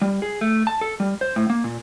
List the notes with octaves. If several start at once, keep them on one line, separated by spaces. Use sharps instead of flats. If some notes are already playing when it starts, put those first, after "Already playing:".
G3
G#4
A3
A5
A4
G3
C5
A2
A#3
A#2